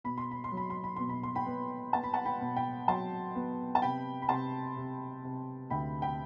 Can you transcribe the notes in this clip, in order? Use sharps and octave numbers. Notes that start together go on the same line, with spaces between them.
B2 B5
C6
B5
C6
F#3
B5
C6
B5
B2 C6
B5
C6
G5 B5
B3
B3 A5
B5
F#5 A5
G5 B5
B2
G5 B5
F#3 A5 C6
B3
A5
C3 G5 B5
B5
C3 A5 C6
C3
C3
D2 G5 B5
G5 B5